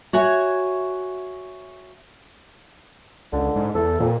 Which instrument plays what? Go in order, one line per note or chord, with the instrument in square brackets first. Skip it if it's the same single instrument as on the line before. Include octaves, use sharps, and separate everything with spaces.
[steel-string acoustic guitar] F#4 C#5 E5 G#5
[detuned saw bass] C#2 [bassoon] D3
[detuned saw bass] G#2
[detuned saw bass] E2 [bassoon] A4
[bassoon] F2 [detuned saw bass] A#2